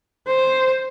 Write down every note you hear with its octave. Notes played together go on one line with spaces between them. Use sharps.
C5